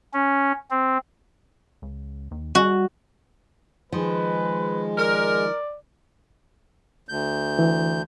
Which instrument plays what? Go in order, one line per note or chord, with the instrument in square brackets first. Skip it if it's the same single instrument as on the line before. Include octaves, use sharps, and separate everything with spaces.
[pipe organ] C#4
C4
[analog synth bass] C#2
D#2
[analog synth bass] G3 [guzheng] F#4
[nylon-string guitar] D#3 F3 [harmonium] G#3 [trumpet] B4
[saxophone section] A#4 [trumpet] D5
[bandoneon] D2 G6
[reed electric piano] E3